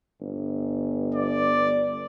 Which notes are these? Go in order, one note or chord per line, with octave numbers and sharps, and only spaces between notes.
G1
D5